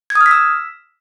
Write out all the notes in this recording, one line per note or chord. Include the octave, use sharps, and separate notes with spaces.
G#6
D#6
F6
B6
E6